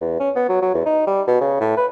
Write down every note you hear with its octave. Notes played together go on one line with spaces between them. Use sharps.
E2
C#4
B3
F#3
F#3
E2
D#4
G3
B2
C#3
A2
B4